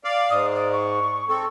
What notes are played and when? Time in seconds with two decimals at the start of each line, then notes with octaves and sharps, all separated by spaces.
0.04 D5 F5
0.30 G#2 D#6
0.55 D5
0.73 C#6
1.29 C4 A4 C#6